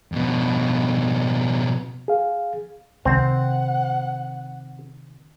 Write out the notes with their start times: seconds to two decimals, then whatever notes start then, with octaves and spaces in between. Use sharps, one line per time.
0.12 F2 B2
2.08 G#4 F5
3.05 C3 D#3 C4 F#5